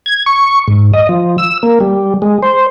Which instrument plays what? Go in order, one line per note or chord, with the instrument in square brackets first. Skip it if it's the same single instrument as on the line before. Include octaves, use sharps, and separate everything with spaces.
[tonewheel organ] G#6
C#6
G#2
D#5
F3
E6
A#3
G3
G#3
C5